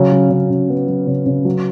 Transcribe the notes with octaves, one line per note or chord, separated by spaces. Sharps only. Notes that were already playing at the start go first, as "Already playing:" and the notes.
Already playing: C#3 F#3 C#4
F#3
C#3
C#3
F#3 B3
F#3
C#3
C#3
F#3